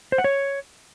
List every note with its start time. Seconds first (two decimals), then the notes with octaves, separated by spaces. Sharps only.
0.12 C5
0.18 F#5
0.24 C#5